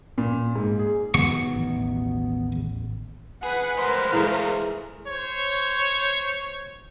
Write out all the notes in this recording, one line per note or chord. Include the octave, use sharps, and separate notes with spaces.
A#2
G#2
G#4
D#2 B2 F#3 B3 C#6
A1
G#4 B4 F#5
A2 G#3 A#4 C5
E3 G#3 A3 F4 A4
C5 C#5